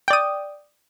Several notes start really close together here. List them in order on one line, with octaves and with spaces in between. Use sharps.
G5 D5 D#6